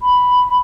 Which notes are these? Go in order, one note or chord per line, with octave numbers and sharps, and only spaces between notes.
B5